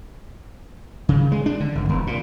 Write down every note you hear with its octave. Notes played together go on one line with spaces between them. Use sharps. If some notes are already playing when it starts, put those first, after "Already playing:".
C#3
G#3
D4
D3
G#1
E1
A#2